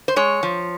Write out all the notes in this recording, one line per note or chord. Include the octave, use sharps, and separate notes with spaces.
C5
G#3 C#5
F3